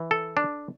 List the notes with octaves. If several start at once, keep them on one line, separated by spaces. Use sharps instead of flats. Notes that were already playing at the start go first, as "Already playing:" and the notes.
Already playing: E3
A4
D4